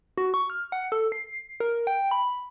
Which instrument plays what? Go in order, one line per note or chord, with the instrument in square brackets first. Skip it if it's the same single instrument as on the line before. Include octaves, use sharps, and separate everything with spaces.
[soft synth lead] F#4
C#6
F6
F#5
A4
C7
A#4
G5
B5